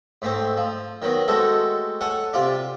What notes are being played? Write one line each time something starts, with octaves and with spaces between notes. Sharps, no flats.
G#2 A3 C4
F3
D#3 F#3 B3
G#3 A3 C4 F#4 A4
A4 C#5 F#5 G#5
C3 F4 D5